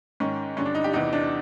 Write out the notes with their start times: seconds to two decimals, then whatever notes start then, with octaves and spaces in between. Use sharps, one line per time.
0.20 G#2 D#3 C#4
0.57 G2 D3 C#4
0.66 D4
0.75 D#4
0.84 G4
0.93 E2 C3 E3 D#4
1.13 D4